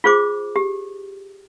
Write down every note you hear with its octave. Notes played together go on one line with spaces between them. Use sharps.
F4 G#4 C5 D6
G4